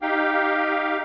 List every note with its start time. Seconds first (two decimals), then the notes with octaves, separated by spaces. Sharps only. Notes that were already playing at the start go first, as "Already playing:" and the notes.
0.02 D#4 G4 F5 G5